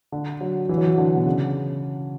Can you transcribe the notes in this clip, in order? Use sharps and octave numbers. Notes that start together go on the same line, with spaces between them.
D3
F#3
E3
F#3
E3
D3
B2
C#3